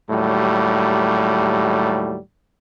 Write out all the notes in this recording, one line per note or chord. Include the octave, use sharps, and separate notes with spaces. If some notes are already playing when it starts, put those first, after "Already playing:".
D#2 A2 F#3 G3